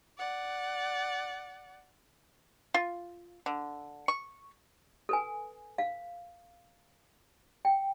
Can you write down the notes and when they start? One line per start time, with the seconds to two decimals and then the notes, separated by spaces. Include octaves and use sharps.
0.18 D5 F#5
2.74 F4
3.46 D3
4.08 C#6
5.09 A4 B4 G#5
5.78 F5
7.65 G5